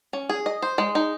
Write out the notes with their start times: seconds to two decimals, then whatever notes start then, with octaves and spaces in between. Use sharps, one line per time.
0.13 C#4
0.29 G#4
0.46 D#5
0.62 C5
0.78 G#3
0.95 D#4